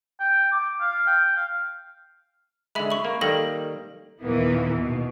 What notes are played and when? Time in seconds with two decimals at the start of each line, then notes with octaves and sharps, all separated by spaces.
0.20 G5
0.52 D6
0.80 F5
1.07 G5
1.36 F5
2.75 D3 G#3 E5 B5
2.90 B5 C#6
3.05 A#3
3.21 D#3 G3 A#3 A4 A#6
4.23 D#2 A#2 D#3 E3 A#3 B3
4.78 B2